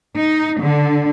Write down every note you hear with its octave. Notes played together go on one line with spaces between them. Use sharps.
D#4
D3